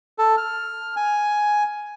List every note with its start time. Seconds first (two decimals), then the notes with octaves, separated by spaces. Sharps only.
0.18 A4
0.37 F6
0.96 G#5